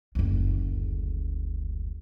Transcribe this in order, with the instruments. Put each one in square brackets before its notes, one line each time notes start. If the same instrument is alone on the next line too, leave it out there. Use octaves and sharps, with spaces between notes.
[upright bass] F#1 D2